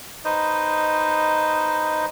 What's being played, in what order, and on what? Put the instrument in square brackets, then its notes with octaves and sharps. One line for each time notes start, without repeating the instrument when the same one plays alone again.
[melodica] D#4 B4 C5 D#5